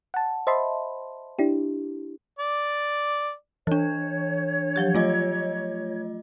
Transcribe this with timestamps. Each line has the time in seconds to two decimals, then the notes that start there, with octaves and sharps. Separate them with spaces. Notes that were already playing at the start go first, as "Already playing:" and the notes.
0.14 F#5 A5
0.47 C5 D#5 E5 A5 B5 C6
1.39 D4 E4 G4
2.39 D5
3.67 E3 D4 C#5
4.76 F3 F#3 G4
4.95 A3 F4 D#5